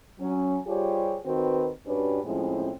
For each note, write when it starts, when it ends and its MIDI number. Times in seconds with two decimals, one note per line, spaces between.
0.20 0.58 54
0.20 0.58 61
0.67 1.18 55
0.67 1.18 65
0.67 1.18 67
0.67 1.18 68
0.67 1.18 72
0.67 1.18 73
1.26 1.71 51
1.26 1.71 60
1.26 1.71 66
1.26 1.71 71
1.87 2.21 43
1.87 2.21 61
1.87 2.21 62
1.87 2.21 66
1.87 2.21 67
1.87 2.21 71
2.25 2.71 45
2.25 2.71 53
2.25 2.71 56
2.25 2.71 60
2.25 2.71 61
2.25 2.71 64